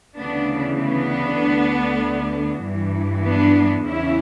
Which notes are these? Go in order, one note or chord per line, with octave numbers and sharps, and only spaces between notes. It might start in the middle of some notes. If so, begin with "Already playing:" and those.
D2 C#3 E3 B3 D4
B3 D4
D2 D3
G2 E3
B3 D4
E2 C#3 E3 C#4 E4